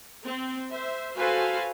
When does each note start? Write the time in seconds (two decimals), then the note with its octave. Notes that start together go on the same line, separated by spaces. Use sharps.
0.25 C4
0.70 C5 E5
1.17 F#4 A4 B4 C5 F5 G#5